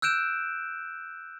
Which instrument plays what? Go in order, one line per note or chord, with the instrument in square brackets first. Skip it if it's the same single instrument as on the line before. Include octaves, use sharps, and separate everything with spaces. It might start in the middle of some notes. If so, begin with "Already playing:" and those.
[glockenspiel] E6 F#6 G6 D7 E7